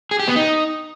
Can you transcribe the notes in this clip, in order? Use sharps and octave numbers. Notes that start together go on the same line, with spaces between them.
G#4
G4
B3
D#4